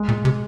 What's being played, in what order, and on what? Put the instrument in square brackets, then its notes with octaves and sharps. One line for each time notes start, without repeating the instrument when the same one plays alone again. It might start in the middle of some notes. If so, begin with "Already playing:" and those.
Already playing: [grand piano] G#3
[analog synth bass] A#2
C3